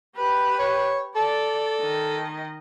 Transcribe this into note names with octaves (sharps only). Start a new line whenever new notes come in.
G4 B4
C#5
A4 D5
D#3 D#5